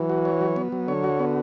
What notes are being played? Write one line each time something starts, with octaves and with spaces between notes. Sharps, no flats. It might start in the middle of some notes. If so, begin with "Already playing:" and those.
Already playing: E3 F#3
F#4
C#5
F#3
B3
F#3
D3 C#5
F#4
B3